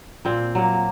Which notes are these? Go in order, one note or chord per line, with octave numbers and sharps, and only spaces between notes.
A#2 C4
F#3 A#3